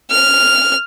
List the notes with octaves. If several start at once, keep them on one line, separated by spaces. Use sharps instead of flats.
F6